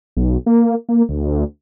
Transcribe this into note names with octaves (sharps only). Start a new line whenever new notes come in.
B1
A#3
A#3
D2